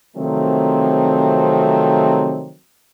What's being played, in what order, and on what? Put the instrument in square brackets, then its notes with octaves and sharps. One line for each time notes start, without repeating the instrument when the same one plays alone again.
[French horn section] C3 D#3 F3 F#3 A3 C4